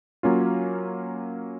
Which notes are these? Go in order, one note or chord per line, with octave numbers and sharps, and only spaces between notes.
F#3 A#3 C#4 F4